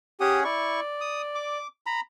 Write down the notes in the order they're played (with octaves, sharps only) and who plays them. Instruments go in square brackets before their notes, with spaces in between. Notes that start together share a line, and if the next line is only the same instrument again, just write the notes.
[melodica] C#4 G#4 F#5 [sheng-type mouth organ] G4 D#6
[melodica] E4 C#6 [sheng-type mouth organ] D5
[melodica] D#6
D6
A#5 B5